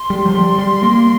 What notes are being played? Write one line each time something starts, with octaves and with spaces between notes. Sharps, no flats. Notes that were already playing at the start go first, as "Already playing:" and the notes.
Already playing: C6
G3
F3
G3 C6
G3
A#3